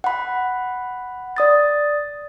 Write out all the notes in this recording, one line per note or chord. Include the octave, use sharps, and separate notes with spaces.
F#5 B5
D5 D#6 A6